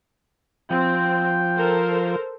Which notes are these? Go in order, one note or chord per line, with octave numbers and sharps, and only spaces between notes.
F3 C4 G5
A4 A#4 C5